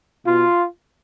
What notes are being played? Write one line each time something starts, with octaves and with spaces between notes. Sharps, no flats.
B2 F4